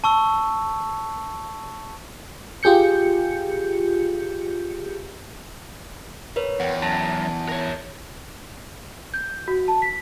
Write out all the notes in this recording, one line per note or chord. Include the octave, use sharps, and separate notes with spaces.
A5 C#6 E6
F4 G4 G#4 G6 C#7
A#4 B4 C#5
E2 F#5 G5
F#2 A5
A#4 C#5
G6
F#4
A5
B6